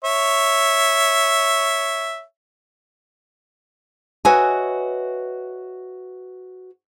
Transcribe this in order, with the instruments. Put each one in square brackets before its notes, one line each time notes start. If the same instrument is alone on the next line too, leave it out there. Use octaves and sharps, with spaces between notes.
[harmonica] C#5 E5
[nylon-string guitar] F#4 B4 C#5 D#5 E5 G#5